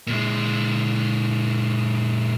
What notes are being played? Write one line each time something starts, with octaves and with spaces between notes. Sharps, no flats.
A#2 G#3